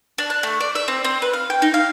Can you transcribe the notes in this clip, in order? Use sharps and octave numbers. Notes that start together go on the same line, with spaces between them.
D4
F#6
A3
D5
E5
C4
C4
B4
F5
G5
D#4
F5